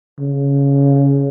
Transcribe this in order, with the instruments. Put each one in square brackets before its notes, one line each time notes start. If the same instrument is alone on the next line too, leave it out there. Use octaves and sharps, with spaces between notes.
[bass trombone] C#3